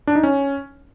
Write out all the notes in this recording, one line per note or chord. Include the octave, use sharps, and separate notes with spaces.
D4
D#4
C#4